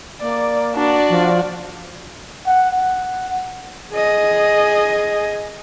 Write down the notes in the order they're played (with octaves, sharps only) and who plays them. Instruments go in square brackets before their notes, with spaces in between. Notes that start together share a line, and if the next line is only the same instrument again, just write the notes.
[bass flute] A#3 [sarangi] D5
[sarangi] D4 [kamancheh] F#4 D5
[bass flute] F3
[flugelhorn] F#5
F#5
[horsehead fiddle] G#4 D#5